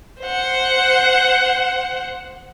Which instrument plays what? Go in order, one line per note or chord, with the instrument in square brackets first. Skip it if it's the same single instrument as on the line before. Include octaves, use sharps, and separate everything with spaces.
[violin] C5 F#5